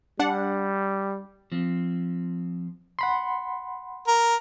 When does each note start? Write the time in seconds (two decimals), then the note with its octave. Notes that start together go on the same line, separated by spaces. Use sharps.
0.19 G3 D4 F#5
1.52 F3 C4
2.99 F#5 B5 C6
4.08 A#4